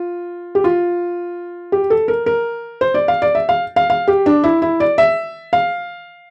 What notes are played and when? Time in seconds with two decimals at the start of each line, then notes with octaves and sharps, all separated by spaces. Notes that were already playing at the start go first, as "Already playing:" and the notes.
Already playing: F4
0.55 G4
0.64 F4
1.72 G4
1.90 A4
2.08 A#4
2.26 A#4
2.81 C5
2.94 D5
3.08 F5
3.22 D5
3.35 E5
3.49 F5
3.76 F5
3.90 F5
4.08 G4
4.26 D4
4.44 E4
4.62 E4
4.80 D5
4.98 E5
5.53 F5